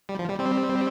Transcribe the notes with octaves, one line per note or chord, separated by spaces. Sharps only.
G3
F3
G3
G3 C4